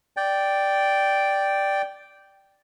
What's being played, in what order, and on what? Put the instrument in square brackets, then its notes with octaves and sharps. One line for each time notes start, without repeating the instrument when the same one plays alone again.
[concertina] D5 G5